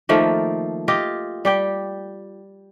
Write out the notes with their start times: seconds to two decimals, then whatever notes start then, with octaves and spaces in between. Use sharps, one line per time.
0.09 D#3 F3 A3 A#3
0.88 F4 G4 D#5
1.45 G3 G4 G5